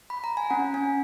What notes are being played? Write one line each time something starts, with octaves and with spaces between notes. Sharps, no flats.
B5
A#5
G#5
C#4 F#5
C#4 G#5